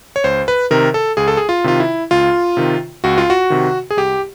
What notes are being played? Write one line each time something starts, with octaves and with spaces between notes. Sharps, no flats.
C#5
C#2 C5
B4
C3 D#3 A#4
A4
C#2 G#4
A4
G#4
F4
C3 D#3 F4
E4
C#2 F4
C3 D#3
C#2 F#4
F4
F#4
C3 D#3
G#4
C2 G4